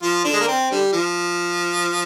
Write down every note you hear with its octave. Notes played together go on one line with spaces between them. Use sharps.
F3 F4
D3 D4
G#3
A#3
C4
D3 G3
F3